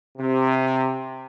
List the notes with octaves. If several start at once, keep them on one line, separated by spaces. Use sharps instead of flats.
C3